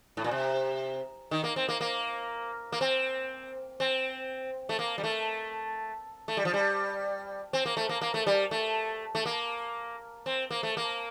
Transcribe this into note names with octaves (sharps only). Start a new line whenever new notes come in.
A2
A#2
C3
D#3
A#3
C4
A#3
A#3
A#3
C4
C4
A3
A#3
G3
A3
A3
G3
F3
G3
C4
A#3
A3
A#3
A#3
A3
G3
A3
A3
A#3
C4
A#3
A3
A#3